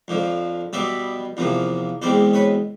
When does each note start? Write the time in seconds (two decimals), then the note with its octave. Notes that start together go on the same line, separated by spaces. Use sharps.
0.08 F2 D3 F3
0.73 B2 G3 B3 D5 E5
1.37 E2 C3 F3 A#3
2.02 E2 B2 G#3 C4 C5 D5
2.34 B4 C#5